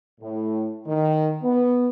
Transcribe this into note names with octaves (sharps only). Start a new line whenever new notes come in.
A2
D#3
B3